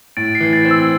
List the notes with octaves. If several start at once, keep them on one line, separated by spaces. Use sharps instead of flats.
A2 A6 D7
C7
E3
C7
A6
C4
E6